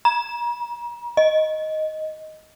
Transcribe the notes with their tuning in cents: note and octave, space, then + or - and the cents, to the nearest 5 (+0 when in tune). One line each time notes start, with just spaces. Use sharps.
A#5 +40
D#5 +5